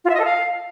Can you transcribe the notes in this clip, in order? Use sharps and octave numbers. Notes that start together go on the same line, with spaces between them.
F4
E5
D#5
A4
F5